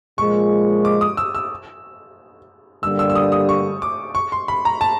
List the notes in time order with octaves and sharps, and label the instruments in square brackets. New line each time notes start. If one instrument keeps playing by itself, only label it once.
[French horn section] A#2 F3 G#3 [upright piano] C#6
[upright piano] D6
D#6
E6
E6
[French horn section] G2 D3 G3 A#3 D4 [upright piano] E6
[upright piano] E6
E6
D#6
D#6
C#6
D6
C#6
C6
B5
A#5
A5